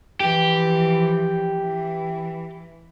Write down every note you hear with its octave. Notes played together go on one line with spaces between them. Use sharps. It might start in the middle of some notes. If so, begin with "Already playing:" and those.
E3 F3 G4
E3